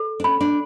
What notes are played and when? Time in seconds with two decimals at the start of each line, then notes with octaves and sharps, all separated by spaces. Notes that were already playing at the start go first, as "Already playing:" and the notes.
Already playing: A4
0.20 D4
0.24 C#4 B5
0.41 D4